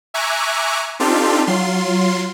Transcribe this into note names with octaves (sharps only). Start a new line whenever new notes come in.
E5 G#5 A#5 C#6 D6 F#6
C4 D4 D#4 F4 G4 A4
F#3 F4 C6